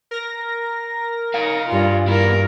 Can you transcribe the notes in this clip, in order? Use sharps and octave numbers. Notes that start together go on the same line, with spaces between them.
A#4 A#6
D#4 F5 G#5
G2 F4
E2 G2 E4 A#4